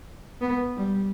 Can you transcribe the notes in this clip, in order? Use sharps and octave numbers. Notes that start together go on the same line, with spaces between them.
B3
G3